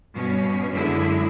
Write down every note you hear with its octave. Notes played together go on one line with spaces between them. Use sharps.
G2 B2 C#4
F#2 D3 G#3 E4